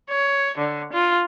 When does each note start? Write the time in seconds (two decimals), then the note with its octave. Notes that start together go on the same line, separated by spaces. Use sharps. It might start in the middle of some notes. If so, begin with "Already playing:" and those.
0.10 C#5
0.58 D3
0.93 F4